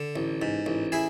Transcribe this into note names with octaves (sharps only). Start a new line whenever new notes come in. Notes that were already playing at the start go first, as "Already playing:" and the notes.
Already playing: D3
A1
G#2
A1
E4 G#4